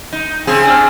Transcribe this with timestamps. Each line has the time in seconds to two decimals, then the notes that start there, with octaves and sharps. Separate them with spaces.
0.13 D#4
0.47 C#3 C4 G#4
0.67 D4 E6 F6